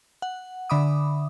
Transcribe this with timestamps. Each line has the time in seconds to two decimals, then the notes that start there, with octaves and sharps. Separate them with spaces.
0.22 F#5
0.70 D3 E5 B5 D6 D#6